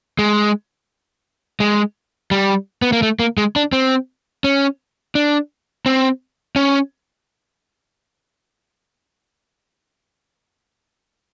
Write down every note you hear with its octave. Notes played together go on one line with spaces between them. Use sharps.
G#3
G#3
G3
B3
A#3
A3
A#3
G#3
D4
C4
C#4
D4
C4
C#4